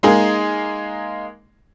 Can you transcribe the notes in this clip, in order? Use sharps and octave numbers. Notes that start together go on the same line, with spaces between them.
G#3 A#3 D#4 G#4